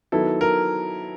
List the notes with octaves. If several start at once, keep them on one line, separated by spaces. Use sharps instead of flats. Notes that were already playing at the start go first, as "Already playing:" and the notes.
D#3 F#3 B3 E4 A4
A#4